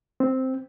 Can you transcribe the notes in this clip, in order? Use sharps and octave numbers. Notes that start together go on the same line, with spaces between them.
C4